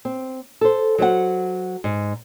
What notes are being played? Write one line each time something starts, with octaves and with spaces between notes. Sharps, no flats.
C4
A4 C5
F#3 C5 D5 F#5
G#2